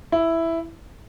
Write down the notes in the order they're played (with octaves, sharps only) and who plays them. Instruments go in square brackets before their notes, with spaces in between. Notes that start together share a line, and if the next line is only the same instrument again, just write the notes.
[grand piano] E4